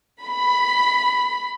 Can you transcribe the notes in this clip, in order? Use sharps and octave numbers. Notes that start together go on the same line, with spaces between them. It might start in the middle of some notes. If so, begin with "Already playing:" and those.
B5